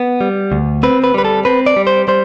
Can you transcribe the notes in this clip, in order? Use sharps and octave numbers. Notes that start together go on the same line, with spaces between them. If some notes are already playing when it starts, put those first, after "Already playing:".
Already playing: B3
G3
D2
C4 B4
B4
G3 B4
A4
C4 B4
D5
G3
C5
G3 C5